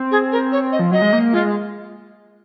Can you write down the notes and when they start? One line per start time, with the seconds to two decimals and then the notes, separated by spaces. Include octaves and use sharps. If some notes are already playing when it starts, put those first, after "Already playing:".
Already playing: C4
0.11 G#4
0.32 A#4
0.52 C#5
0.72 D#5
0.79 F3
0.91 F#3 D#5
1.02 G#3
1.13 A#3
1.33 G#3 F4